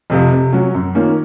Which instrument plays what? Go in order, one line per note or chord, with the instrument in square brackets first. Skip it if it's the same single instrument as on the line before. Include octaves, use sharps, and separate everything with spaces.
[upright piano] F2 C3 F3
C3
F#3 C#4 F#4
F#2
D#3 A#3 C#4 F4